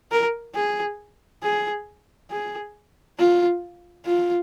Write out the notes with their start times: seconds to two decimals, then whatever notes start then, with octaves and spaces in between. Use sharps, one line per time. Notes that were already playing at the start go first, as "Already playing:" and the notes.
0.12 A#4
0.55 G#4
1.43 G#4
2.31 G#4
3.18 F4
4.06 F4